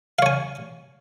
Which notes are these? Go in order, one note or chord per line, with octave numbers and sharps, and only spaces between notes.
C#5 F5 G#5